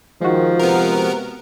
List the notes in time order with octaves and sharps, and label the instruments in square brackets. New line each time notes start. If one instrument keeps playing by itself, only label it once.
[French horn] D#3 [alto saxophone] F3 [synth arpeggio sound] G#3 F#4
[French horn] C3 [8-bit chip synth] B3 A#4